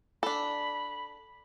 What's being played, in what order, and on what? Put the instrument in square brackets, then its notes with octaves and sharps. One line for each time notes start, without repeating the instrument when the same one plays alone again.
[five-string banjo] D4 A4 [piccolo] B5